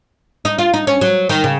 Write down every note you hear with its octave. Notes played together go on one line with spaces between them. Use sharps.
D#4
F4
D#4
C#4
F#3
D#3
C#3